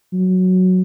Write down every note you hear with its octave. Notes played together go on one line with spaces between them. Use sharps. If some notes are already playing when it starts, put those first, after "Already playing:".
F#3